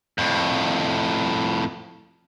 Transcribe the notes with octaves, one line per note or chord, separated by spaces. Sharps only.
F2 A2